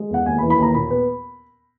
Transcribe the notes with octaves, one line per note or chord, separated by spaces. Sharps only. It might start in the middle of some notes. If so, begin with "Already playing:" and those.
Already playing: G#3
E2 F#5
D#2 G#5
B5
E3
B5
D#2 A#5
A#2 B5
B3